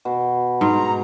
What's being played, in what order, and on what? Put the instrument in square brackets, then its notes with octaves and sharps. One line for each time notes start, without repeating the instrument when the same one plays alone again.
[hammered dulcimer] B2
[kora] G#2 [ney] A#5